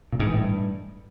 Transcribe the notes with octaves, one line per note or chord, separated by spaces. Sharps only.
A#2
G#2
E3
A2
G2